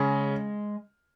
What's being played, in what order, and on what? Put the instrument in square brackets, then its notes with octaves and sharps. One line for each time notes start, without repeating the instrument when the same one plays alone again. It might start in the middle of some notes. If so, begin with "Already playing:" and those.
Already playing: [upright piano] C#3 C#4 [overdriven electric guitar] G#3